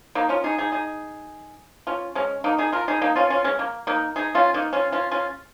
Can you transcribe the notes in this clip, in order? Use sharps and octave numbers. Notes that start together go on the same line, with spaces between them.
A#3 D#4
C#4 F4
D#4 G#4
D#4 G#4
D#4 G#4
C#4 F4
G#3 C#4
A#3 D#4
D#4 G#4
F4 A#4
D#4 G#4
A#3 D#4
C#4 F4
C#4 F4
G#3 C#4
A#3
A#3 D#4
D#4 G#4
C#4 F4
A#3 D#4
C#4 F4
C#4 F4
C#4 F4